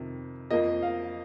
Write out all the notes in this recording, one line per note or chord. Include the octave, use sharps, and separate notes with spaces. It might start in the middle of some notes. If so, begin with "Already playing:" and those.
Already playing: F2 C3 D#3
F2 F3 A#3 D#5
F5